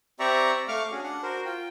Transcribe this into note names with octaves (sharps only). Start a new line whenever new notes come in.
C4 G4 D5 E5 A#5 C#6
A3 F5 C#6 D6 F6
C#4 D4 F#4 G#4
D4 F#5
F#4 A#4 C5
F4 G5